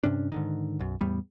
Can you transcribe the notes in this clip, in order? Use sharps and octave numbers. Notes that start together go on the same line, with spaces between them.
G2 C3 C#4 D4
G#2 D3 D#3
B1 F#2
E2 A2 G3 B3